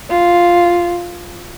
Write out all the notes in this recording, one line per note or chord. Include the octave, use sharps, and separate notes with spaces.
F4